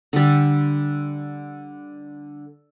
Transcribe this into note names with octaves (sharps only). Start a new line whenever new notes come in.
D3 G3